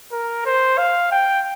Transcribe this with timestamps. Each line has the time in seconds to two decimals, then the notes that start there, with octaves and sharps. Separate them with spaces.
0.12 A#4
0.46 C5
0.78 F5
1.12 G5